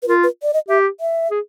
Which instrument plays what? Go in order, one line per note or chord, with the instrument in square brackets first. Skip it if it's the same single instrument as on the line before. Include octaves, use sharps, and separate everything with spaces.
[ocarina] B4
[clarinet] F4 [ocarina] A#4
[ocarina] B4
D5
D#5
[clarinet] G4 [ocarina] E5
[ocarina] E5
[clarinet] G#4